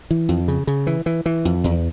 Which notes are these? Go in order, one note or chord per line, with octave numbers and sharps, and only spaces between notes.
E3
F2
C#3
C#3
E3
E3
E3
F2
E2